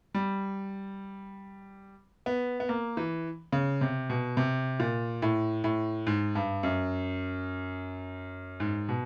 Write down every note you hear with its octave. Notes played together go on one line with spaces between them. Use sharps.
G3
B3
B3
A#3
E3
C#3
C3
B2
C3
A#2
A2
A2
G#2
G2
F#2
G#2
B2